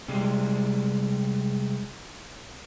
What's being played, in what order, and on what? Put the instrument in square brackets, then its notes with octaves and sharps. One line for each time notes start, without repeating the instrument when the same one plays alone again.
[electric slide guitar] C3 G3 G#3